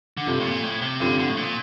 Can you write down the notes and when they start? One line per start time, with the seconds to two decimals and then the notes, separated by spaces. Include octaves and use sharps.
0.17 D3
0.26 G2 C3 F3 C4 F4 A4
0.40 A2
0.46 A#2
0.64 A2
0.82 C3
1.00 G2 D3 F3 C4 F4 A4
1.19 D3
1.29 A2
1.37 A#2